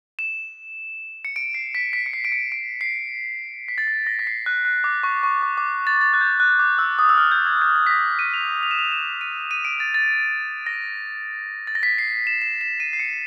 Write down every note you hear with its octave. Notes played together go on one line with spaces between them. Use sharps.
E7
C#7
D7
C7
B6
B6
C#7
C7
D7
C#7
D7
C7
B6
A6
A#6
A#6
B6
C7
F#6
F#6
D6
C#6
C#6
D6
D6
A6
A6
F#6
G6
F#6
D6
E6
D#6
E6
F6
G6
G#6
G6
G#6
B6
A#6
D#7
F7
F7
E7
F7
E7
D#7
D#7
D7
A6
A6
A#6
A6
A#6
B6
C7
E7
E7
E7
D#7
C7
C#7